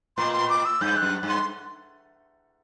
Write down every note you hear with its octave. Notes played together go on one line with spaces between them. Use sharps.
A2 C6
C6
D6
E6
G2 G6
F#6
F#2
G2
C6